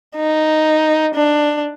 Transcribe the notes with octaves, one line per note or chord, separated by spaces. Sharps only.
D#4
D4